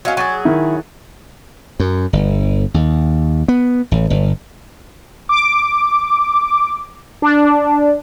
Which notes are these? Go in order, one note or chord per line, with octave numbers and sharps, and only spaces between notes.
F#3 C#4 F#4 D#5 F5
F#3 G#4 C#6 A6
D#3 E4
F#2
G1
D#2
B3
A1
G1
D6
D4